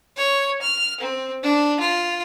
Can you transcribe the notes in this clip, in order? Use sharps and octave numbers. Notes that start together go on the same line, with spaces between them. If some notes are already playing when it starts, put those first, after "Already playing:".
C#5
F6
C4
D4
F4